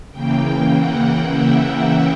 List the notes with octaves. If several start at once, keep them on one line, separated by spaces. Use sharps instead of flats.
C#3 E3 A#3 G5
F#5
E5